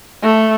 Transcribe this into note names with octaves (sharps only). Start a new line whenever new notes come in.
A3